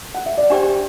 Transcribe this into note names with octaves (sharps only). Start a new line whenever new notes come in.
F#5
E5
D5
D4 G4 C5 D5 G5